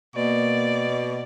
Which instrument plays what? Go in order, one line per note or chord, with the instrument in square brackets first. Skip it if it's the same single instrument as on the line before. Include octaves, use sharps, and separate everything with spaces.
[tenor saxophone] B2 [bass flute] A#3 [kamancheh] D5